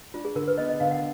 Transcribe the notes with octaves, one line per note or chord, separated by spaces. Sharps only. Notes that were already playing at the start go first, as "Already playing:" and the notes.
D4 F4
G#4
D3 A#4
B4
B3 D#5
D#5
D3 F5
F#5